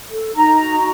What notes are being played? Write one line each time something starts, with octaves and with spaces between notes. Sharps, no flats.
A4
D#4 A#5
F#4